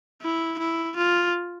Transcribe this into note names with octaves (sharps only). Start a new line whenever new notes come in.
E4
E4
F4